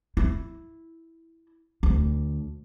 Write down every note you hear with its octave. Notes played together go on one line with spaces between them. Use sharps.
E4
D2